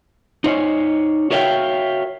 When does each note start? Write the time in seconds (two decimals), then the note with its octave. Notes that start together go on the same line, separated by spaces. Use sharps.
0.44 D#4 C5 C#5 G#5
1.31 F#4 A#4 C#5 E5 F5 G5